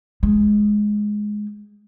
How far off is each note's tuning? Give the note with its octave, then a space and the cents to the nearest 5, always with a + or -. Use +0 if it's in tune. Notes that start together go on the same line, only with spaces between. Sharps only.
G#3 +5